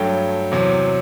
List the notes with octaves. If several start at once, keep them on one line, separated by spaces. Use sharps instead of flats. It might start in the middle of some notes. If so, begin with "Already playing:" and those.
Already playing: G2 F#3 A3 G5
E2 C3 F#3